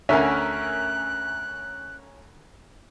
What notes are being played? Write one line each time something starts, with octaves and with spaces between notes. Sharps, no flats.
D2 D3 C#4 A#4 E5 G#5 F#6